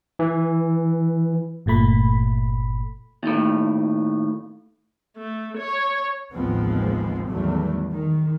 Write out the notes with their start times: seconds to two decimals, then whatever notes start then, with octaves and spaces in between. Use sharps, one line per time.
0.19 E3
1.66 G1 A#2 A3 B5
3.23 D#2 A2
5.17 A3
5.58 C#5
6.32 A1 D#2 F3 G#3 B3 C4
7.26 E2 D#3 F#3 G3 A3
7.91 D#3